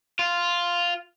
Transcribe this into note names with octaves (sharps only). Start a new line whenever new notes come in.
F4